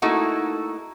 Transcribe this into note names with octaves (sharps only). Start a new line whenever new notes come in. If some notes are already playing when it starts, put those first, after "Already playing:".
A3 A#3 D#4 E4 F#4